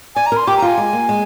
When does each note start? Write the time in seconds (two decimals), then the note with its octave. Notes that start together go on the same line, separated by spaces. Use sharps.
0.15 D5 G#5
0.26 A#5
0.32 A#4
0.37 C6
0.47 G4 D6
0.57 A#5
0.62 F4
0.67 G#5
0.78 G#3
0.93 A#3
1.09 G#3